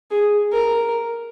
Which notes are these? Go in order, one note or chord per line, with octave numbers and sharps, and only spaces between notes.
G#4
A#4